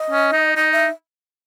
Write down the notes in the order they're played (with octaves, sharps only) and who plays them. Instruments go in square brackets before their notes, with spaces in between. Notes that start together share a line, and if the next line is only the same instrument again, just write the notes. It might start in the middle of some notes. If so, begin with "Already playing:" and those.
Already playing: [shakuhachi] D#5
[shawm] C#4
D#4
[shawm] D#4 [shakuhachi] D#5
[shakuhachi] E5